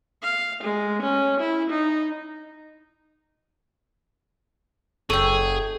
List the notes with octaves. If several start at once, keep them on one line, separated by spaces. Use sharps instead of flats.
F5
G#3
C#4
E4
D#4
F#1 G#4 A4 C#5 G5